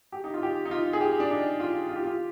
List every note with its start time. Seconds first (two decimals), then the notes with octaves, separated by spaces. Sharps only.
0.12 G4
0.24 D#4
0.34 F4
0.43 G4
0.65 D#4
0.71 F4
0.93 G#4
1.01 G4
1.20 D4
1.31 D#4
1.60 F4
1.89 F4
1.96 G4
2.03 F4